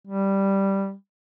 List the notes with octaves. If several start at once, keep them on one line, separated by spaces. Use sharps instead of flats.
G3